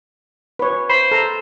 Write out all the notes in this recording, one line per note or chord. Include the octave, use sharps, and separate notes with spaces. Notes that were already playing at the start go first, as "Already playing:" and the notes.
B4 C#5
C5 B5
A4 A#5